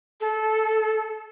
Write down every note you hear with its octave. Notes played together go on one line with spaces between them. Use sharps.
A4